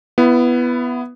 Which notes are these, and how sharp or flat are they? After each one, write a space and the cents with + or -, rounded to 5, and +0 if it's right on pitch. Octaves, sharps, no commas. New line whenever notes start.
B3 +0 E4 +25